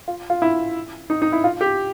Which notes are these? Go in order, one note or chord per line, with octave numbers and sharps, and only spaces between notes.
F4
F4
E4
D#4
D#4
E4
F4
G4